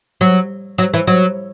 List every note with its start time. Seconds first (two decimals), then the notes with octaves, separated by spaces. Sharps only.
0.21 F#3
0.78 F#3
0.94 E3
1.07 F#3